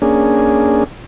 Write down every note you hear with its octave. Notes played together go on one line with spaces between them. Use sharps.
A#3 C#4 D4 G#4